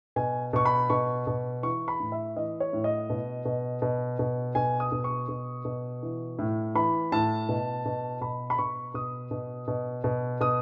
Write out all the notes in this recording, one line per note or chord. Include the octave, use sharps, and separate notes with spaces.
B2 G#5
B2 C#6
B5
B2 C#6
B2
E3 C#6
B5
A2
E5
E3 D#5
C#5
A2
D#5
B2
B2
B2
B2
B2 G#5
D#6
B2
C#6
B2
B2
E3
A2
E3 B5
A2 A5
B2
B2
B2 B5
B5
B2 C#6
B2 D#6
B2
B2
B2
B2 D#6